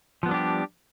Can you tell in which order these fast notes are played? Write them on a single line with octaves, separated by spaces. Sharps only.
F3 B3 G3 D4 G4